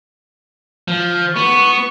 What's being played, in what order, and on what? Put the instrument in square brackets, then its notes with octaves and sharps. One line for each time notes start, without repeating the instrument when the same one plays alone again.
[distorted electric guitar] F3
[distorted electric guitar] B3 [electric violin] C#6